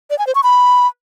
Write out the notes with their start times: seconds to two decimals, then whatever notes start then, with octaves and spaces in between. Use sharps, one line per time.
0.10 D5
0.19 G#5
0.27 C5
0.35 C#6
0.43 B5